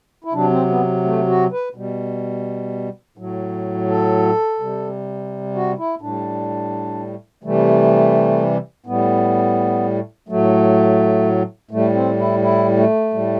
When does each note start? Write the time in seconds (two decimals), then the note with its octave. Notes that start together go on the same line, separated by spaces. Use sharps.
0.24 E4
0.33 C3 F#3 D4
0.50 C4
0.69 B3
1.04 A3
1.28 F#4
1.52 B4
1.75 B2 G3
3.18 A2 F#3
3.89 A4
4.60 C3 G3
5.55 F#4
5.78 E4
6.01 A2 G3 D4
7.44 C3 E3 G3 A3
8.86 A2 G3 B3
10.29 A2 F#3 A3
11.71 A2 G3 A3
11.94 C4
12.19 E4
12.42 E4
12.77 A3
13.14 A2 G3